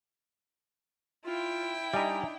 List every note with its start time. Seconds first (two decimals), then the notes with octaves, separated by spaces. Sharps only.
1.25 E4 F4 G5
1.94 G3 D4 D#4 D#5 E5 G#5 A#5